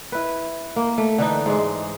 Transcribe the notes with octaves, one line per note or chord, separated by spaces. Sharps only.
E4 B4
A#3
A3
D3 E3 D#4
G#2 G#3